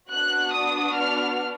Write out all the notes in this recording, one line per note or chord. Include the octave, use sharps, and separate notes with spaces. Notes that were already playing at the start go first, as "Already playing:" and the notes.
B3 D4 F#4 F#6
D#6
F6